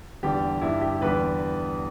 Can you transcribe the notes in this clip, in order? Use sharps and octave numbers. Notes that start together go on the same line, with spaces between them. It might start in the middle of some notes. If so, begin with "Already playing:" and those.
E2 D3 G3 G4
G2 G3 E4
G4
E2 D3 G3 B4